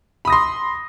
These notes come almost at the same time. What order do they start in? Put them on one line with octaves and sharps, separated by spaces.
B5 D#6 A#6 C6